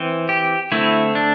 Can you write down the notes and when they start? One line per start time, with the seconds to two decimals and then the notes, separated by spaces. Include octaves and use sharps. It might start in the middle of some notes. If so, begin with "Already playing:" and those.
Already playing: E3 C4
0.29 G4
0.72 D3 A3 C4 E4
1.15 D4